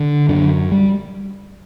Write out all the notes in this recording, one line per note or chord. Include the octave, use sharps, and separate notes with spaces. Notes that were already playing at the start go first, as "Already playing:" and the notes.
Already playing: D3
F#2 D3
G3